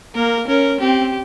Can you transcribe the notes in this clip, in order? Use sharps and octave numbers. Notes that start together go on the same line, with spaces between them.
A#3 A#4
C#4 A#4
C4 G4